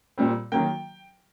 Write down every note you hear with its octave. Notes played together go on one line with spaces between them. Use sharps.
A#2 G3 C4
D#3 F#3 A#3 G5